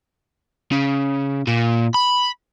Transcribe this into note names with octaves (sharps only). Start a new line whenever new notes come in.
C#3
A#2
B5